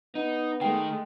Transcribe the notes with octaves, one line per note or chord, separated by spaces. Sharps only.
B3 D#4
D#3 G#3 A3 G5